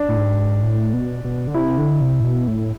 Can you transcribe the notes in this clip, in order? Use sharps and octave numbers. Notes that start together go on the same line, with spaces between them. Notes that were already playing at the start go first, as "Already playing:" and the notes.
Already playing: D4
A2
G#2
A2
B2
B2
D3
C3 E4
D3
C3
A2
B2
A2